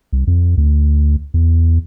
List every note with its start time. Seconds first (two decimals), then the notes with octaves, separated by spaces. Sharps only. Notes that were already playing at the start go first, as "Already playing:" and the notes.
0.13 C2
0.27 F2
0.57 D2
1.34 E2